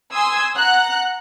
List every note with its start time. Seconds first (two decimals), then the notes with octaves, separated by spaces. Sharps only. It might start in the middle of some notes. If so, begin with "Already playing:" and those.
0.11 G#5 C6 D#6 E6 G#6
0.57 F#5 A#5 F#6